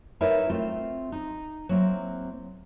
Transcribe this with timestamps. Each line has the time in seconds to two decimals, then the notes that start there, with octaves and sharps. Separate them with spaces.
0.21 D#4 E4 A#4 B4 C#5 E5
0.50 A3 C4 F4
1.12 D#4
1.69 F#3 A#3 C4 E4